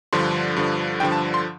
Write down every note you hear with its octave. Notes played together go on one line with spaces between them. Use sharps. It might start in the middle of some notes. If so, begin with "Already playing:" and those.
G2 D3 F3 C6
G2 D3 F3
G2 D3 F3 G5
A5
C6